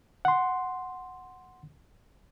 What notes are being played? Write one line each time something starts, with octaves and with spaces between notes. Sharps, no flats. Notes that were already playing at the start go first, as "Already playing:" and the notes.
F#5 C6